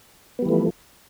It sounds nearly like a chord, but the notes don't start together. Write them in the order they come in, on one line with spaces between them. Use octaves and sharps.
B3 G3 E3 A3 F3